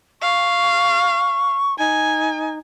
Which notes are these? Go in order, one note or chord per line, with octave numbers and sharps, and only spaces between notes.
F5 C#6
D#4 G#5